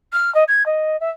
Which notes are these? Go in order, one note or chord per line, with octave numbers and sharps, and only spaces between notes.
F6
D#5
G#6
D#5
E5